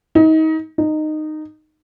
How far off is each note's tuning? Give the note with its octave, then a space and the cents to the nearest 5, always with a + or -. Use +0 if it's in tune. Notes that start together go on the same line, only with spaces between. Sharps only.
D#4 +30
D#4 -15